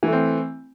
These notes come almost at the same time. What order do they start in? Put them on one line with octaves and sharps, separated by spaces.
E3 A3 C4